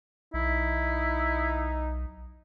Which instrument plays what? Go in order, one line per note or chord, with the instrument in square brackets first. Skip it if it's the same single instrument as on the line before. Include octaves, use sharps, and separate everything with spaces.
[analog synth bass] B1 [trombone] D#4 [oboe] E4